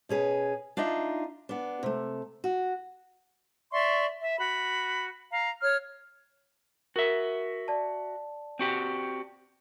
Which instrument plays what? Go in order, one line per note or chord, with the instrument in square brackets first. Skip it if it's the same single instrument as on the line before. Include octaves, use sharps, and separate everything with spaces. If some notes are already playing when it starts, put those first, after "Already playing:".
[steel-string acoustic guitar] B2 C#4 G#4 B4
D4 D#4 F4 D#5 E5
B3 D4
C3 A3
F#4
[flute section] D5 E5 C6 C#6
E5
F#4 B5
F5 A#5
C#5 F6
[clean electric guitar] F#4 E5 [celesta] A#4
[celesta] D5 A5
[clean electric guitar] C4 F#4 G4